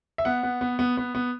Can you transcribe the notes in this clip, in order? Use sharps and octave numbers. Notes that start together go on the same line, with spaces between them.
E5
B3 F#5
B3
B3
B3
B3
B3